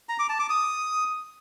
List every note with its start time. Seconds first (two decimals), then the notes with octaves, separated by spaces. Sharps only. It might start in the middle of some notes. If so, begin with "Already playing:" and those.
0.09 A#5
0.19 D6
0.29 A5
0.39 D6
0.50 D#6